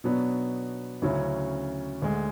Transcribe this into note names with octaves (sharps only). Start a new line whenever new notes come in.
B2 F#3 B3 D4
D2 C#3 F#3 C#4 E4
D2 D3 G#3